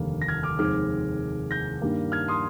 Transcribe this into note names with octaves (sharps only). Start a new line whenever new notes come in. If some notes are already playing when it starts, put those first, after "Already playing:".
Already playing: F1 D#2 D3 G3 A#3
A#6
F6 G#6
D6 F6
F1 D#2 D#3 G#3 C4 D6 F6
G6 A#6
G2 D#3 G3 A#3
F6 G#6
C6 D#6